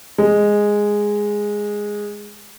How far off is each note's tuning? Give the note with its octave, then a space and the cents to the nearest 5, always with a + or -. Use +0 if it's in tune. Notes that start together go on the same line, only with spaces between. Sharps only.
G#3 -5